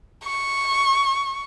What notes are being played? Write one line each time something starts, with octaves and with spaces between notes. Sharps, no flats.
C#6